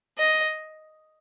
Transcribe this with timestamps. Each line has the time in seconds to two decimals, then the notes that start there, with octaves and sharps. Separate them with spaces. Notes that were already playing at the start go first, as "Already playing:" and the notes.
0.18 D#5